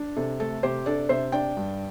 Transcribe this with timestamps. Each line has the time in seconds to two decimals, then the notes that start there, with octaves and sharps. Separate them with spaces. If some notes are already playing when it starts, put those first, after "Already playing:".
Already playing: D4
0.16 C3 A4
0.40 A3 A4
0.63 C3 G4 C5
0.86 D4 A4 D5
1.09 C3 C5 E5
1.32 D4 D5 G5
1.57 G2